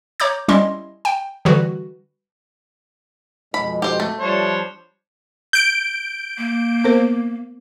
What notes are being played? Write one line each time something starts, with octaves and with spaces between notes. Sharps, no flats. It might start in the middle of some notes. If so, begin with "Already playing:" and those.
C#5 A#5 D6 G6
G3 C#4 E4 D#5 C6
G5
D3 E3 G3 F#4 B4
F2 B2 G#3 B5
G4 C5
A3
F3 G3 D4 C5 C#5
G6 D7
A#3
B3 A#4 C5